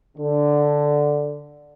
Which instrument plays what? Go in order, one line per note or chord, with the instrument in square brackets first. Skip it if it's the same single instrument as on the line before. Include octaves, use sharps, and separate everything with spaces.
[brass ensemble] D3